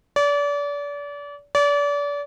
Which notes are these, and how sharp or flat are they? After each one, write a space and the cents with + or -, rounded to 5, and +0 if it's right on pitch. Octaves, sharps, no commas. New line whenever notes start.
D5 -35
D5 -35